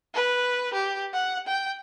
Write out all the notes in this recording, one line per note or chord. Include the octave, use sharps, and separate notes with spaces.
B4
G4
F#5
G5